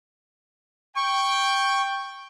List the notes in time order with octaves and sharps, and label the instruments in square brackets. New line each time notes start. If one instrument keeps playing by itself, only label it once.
[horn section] G5 [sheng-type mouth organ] C#6